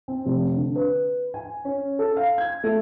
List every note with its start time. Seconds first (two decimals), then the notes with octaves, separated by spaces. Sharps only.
0.08 C4
0.26 F1
0.56 D3
0.76 B4
1.34 G#5
1.65 C#4
1.99 A4
2.17 F5
2.38 G#6
2.63 A3